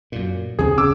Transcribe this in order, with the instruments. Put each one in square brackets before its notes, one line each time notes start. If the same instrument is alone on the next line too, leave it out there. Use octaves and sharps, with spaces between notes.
[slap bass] F#2 A#2
[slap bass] D#2 C#3 C4 [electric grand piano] G#4
[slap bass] D1 C#3 C#4 [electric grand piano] D6 E6